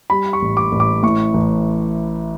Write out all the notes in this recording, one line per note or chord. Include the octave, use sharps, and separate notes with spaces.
G3 B5
C#6
A1
D6
A1
D6
A2 C#6
A1